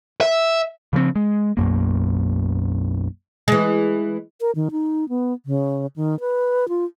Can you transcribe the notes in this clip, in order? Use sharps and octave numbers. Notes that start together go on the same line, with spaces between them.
E5
C#3 F3 G3 C4
G#3
B1 F#2 A#3
E3 G#3
A#4
D#3
D#4
B3
C#3
D#3
B4
F4